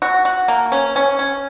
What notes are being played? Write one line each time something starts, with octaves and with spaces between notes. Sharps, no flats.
F#4
F#4
A#3
C#4
C#4
C#4